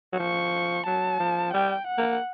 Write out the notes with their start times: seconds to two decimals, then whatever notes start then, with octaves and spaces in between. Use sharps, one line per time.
0.13 F#3
0.19 F3 C#6
0.86 F#3 A5
1.20 F3
1.53 G3 G5
1.87 F#5
1.98 A#3